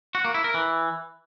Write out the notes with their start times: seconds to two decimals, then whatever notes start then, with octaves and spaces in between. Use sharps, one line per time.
0.15 F#4
0.25 A#3
0.34 E4
0.44 A#4
0.54 E3